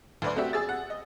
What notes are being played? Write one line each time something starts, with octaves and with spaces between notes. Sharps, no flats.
D2 B4 D5
A3 C4 D4 F#4 G4 E5
G#4 E6 A6
F#5
D#5